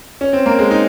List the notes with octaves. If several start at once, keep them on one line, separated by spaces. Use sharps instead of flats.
C#4
C4
A#3
G#3
D#4